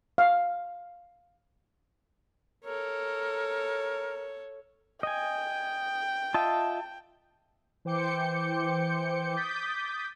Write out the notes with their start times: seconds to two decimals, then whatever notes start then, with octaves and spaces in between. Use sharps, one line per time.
0.18 F5
2.65 A4 A#4 C#5
5.03 D#5 G5 G#5
6.34 F4 D#5 E5 A5
7.85 E3 C5 G5 D6 G6 C#7
9.36 D6 D#6 G6 A6 B6